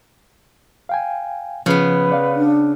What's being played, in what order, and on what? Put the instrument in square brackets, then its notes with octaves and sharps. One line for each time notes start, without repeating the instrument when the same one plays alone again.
[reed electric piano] F5 G5 G#5
[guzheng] C#3 B3 [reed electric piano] F3 [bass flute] B4
[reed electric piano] D5 F5
[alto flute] D4